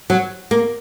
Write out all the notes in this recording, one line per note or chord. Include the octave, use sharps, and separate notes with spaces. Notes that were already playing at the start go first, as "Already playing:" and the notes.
F#3
A#3